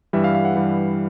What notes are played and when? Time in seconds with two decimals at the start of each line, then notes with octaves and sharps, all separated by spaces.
0.13 G2 E3 G3 E5
0.24 F5
0.35 F5
0.45 F#5
0.56 G2 E3 G3